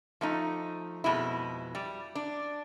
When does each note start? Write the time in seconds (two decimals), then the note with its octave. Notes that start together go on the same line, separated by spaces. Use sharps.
0.21 F3 A3 D#4
1.04 F2 B2 G#3 E4
1.75 G3
2.15 D4